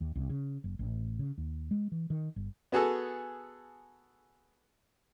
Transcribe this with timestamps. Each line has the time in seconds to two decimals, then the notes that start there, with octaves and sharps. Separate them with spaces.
0.01 D#2
0.15 C2
0.30 C#3
0.64 F#1
0.79 A1
1.19 C#3
1.38 D#2
1.71 G#3
1.92 E3
2.10 D#3
2.36 G1
2.72 B3 F#4 G#4 A4